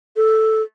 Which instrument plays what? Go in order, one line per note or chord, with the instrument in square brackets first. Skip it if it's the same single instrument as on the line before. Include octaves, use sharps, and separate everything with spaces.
[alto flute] A4